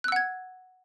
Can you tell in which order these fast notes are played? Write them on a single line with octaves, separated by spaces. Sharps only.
F#6 E6 F#5 G#6